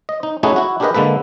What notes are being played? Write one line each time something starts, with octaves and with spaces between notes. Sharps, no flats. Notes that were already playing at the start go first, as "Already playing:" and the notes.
D#5
D#4
A3 C#4 D#4 E4 F#4 G#4
E4 F#4
D4 G4 G#4 A#4 B4 D#5
D3 G#3 A#3 A4 B4